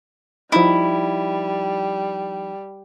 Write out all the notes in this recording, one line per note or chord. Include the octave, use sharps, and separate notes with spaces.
F3 G3 D#4 E4